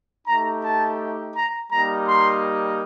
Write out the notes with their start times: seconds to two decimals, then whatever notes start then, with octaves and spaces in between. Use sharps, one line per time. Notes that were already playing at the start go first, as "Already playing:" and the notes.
0.27 A3 D#4 G4 A#5
0.63 A5
1.35 A#5
1.71 G3 A#3 D#4 G4 A#5
2.07 C6